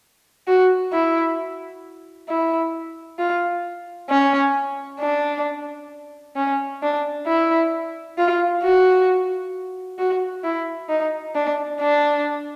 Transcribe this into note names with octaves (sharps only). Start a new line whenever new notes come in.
F#4
E4
E4
F4
C#4
D4
C#4
D4
E4
F4
F#4
F#4
E4
D#4
D4
D4